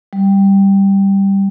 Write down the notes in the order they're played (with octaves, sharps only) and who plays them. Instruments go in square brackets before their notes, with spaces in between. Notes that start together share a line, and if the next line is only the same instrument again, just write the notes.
[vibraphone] G3